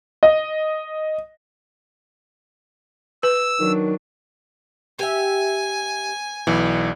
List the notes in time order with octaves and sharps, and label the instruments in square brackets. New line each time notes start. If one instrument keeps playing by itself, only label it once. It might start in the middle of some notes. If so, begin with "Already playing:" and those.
[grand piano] D#5
[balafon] B4 [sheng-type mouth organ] E6
[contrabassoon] D#3 [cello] F#3 D4
[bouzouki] G4 E5 [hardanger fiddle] G#5
[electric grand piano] B1 E3 [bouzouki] D4